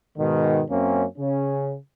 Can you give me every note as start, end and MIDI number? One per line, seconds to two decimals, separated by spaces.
0.18 0.63 44
0.18 0.63 47
0.18 0.63 51
0.71 1.05 42
0.71 1.05 58
0.71 1.05 60
0.71 1.05 61
1.18 1.74 49
1.18 1.74 61